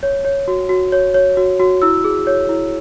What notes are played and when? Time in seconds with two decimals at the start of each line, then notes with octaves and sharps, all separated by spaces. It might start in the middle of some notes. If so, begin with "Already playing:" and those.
0.03 C#5
0.25 C#5
0.48 F#4
0.69 F#4
0.92 C#5
1.14 C#5
1.37 F#4
1.60 F#4
1.82 E4 E6
2.04 G#4
2.27 C#5
2.49 E4